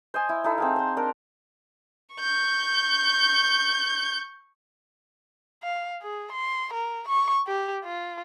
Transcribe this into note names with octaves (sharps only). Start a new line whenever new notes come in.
C5 D#5 G#5
E4
D#4 E4 A4
C4 G#4 F5
C5 C6
D4 A#4
C#6 G6
F5
G#4
C6
A#4
C#6
G4
F4